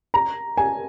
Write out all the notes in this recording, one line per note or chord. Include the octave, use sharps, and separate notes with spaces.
A#5
G#5